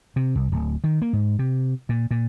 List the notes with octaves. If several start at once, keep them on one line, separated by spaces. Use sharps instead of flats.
C3
C2
D1
D#3
A#3
G#2
C3
A#2
A#2